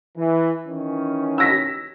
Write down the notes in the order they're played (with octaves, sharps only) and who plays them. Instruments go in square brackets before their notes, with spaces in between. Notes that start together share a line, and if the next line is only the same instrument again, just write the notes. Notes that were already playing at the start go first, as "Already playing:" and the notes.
[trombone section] E3
D#3 E3 C#4
[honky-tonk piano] E6 A#6 B6